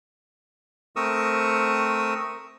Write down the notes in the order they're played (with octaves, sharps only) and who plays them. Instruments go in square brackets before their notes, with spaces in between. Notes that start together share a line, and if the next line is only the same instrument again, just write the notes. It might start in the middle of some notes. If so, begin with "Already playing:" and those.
[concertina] A3 C4 A#4 C#6 D#6 E6